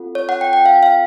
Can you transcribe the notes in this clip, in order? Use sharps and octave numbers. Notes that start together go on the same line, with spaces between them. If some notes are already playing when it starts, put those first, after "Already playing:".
Already playing: C4 F4 A4
C#5
F#5
G5
G5
F5
F5